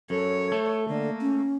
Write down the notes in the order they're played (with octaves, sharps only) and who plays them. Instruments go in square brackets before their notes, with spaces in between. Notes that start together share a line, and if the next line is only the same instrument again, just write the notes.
[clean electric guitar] F#2 [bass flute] A4 [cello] C#5
[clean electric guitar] A3
[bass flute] D3 [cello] A#3
[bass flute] C#4